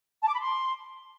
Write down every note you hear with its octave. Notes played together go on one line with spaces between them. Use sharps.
A5
D6
B5
C6